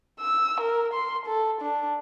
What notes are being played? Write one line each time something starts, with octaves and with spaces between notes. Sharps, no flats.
E6
A#4
C6
A4
D4